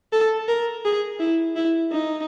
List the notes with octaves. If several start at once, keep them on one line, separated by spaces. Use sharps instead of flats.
A4
A#4
G#4
E4
E4
D#4